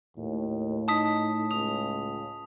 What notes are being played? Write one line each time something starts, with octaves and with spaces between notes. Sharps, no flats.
D#2 A2
D#4 A5 D#6 B6
C#2 D#6 F7